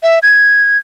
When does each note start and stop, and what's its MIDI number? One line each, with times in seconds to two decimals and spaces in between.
0.03 0.19 76
0.23 0.78 92